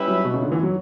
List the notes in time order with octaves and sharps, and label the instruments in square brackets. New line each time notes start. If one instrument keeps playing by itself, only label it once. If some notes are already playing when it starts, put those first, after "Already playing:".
Already playing: [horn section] G3 C#4 E4 B4 E5
[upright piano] F#3
B2
C#3
D3
E3
F#3